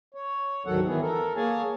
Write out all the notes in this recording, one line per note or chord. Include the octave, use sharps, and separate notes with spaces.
C#5
D2 G#2 D#3 F#3 A4 F#5
D#3 E3 B3 G#4
A4 A#4
A#3 G#4 C#5 G#5 A5